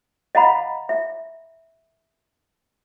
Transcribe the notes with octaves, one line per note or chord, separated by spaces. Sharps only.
D#5 F5 F#5 A#5 B5
E5